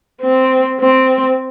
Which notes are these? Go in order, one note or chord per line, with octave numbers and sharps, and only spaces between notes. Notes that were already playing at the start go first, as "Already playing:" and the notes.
C4
C4